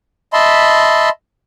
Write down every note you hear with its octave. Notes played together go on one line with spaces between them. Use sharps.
D#5 E5 A5 B5 C6